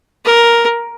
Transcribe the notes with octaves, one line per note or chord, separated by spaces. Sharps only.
A#4